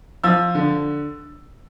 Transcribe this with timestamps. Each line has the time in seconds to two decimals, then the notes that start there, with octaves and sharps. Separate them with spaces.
0.24 F3 E6
0.55 D3